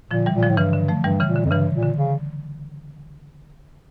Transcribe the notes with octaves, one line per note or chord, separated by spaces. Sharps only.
A#2 D3 F3
E3 G3
A#2
D3 F3
A2
G2 C#3 E3
D3
F3 A3
G2 E3 G3
C#3 E3
A#2
D3
F2
G2 C#3 E3
A#2
D3
C#3